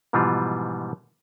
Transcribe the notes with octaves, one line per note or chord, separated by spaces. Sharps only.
G#2 B2 E3 F3 G3 F4